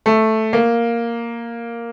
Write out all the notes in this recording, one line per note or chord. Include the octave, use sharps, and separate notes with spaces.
A3
A#3